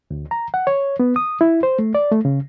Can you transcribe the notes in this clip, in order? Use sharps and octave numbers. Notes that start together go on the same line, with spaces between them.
D2
A#5
F#5
C#5
B3
D#6
E4
C5
A3
D5
A3
C#3